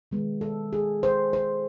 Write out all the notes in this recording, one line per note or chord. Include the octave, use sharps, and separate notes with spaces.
D#3 G#3 B3
A4
G#4
C5
C5